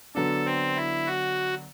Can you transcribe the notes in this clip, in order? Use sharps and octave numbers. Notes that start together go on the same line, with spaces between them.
D3 F#3 B3 D4 A4
C4
E4
F#4